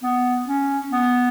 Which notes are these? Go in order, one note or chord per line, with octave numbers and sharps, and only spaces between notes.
B3
C#4
B3